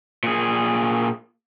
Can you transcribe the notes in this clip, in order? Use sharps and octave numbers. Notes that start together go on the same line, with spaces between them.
A#2 G#4